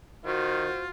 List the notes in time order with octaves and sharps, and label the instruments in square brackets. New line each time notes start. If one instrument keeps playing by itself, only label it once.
[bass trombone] D#3 [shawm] F4 [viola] F#4 [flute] C5